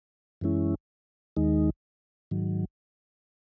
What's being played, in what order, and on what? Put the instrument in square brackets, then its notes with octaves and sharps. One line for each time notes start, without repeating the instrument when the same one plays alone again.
[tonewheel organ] F#2 E3 G#3 C#4 E4
D#2 D#3 G#3 D#4
G#2 D#3 F#3